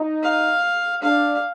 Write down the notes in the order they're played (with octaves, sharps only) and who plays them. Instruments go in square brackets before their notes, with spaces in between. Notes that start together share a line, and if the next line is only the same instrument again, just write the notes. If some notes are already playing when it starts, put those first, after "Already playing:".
Already playing: [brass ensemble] D#4
[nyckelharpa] F5
[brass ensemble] D4 [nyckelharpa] F5